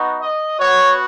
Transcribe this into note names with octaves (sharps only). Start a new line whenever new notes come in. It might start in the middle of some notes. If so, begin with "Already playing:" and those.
Already playing: B3 D#4 F#4
D#5
B3 F#4 C#5